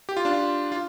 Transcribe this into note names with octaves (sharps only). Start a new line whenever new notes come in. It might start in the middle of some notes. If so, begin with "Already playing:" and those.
G4
F4
D4
F4
F4